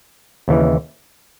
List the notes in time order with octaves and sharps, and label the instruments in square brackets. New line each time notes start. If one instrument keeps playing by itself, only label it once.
[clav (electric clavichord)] D#2 C#3 E3